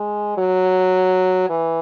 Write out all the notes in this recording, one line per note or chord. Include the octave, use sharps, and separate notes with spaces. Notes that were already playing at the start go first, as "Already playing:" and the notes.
Already playing: G#3
F#3
E3